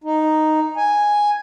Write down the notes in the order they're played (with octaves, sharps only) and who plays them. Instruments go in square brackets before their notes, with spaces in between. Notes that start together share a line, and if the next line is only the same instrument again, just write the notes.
[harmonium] D#4
G#5